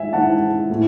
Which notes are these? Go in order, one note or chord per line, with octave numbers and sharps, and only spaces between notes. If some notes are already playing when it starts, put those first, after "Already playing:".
Already playing: G#2 E3 E5 G#5
G#2 E3 F#5 A5
A2 E3